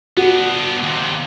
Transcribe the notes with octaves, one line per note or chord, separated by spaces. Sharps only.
B3 D4 F#4
D#2 C3